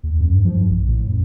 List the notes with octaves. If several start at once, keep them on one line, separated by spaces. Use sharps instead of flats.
D#2
F#2
G2
F3
G2
A#1
A2
F#2